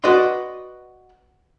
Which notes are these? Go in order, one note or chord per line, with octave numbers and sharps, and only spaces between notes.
F#4 B4 D5 D#5 C6